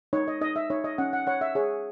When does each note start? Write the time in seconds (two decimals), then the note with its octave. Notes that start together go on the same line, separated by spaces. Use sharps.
0.13 D#4 C#5
0.28 D#5
0.41 D#4 D#5
0.56 E5
0.70 D#4 C#5
0.84 D#5
0.98 C#4 F#5
1.13 F#5
1.27 C#5 F#5
1.41 E5
1.55 G#4 C#5